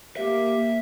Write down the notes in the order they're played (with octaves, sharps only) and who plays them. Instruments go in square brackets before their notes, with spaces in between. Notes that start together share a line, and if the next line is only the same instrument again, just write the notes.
[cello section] A#3 [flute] G4 [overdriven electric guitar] E5